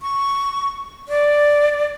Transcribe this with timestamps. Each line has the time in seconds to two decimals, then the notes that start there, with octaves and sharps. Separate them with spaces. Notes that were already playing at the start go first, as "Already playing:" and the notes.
0.01 C#6
1.08 D5